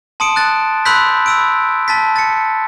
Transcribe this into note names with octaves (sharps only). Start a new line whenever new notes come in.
A5 C6 D#6 C#7 D7 E7
F#6 A6
B5 C6 E6 F#6 G6 B6
B5 E6 D7
A5 A6 B6
A6 C#7